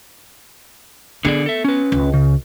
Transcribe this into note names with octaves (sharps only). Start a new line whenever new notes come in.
D3 B3 G#4 D5
A4 E5
C#4 B4
C#2
C#3